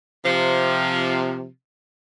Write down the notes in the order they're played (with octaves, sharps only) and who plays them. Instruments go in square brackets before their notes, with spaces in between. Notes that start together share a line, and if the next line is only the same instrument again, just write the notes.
[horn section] C3 F3